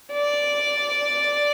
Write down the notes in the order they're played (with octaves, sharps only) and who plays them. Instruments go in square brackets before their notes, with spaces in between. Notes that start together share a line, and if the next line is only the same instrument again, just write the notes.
[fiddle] D5